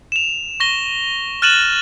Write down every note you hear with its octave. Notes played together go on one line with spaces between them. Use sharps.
E7 F7
C#6 A#6 G7
F6 F#6 A6 D#7 E7 F#7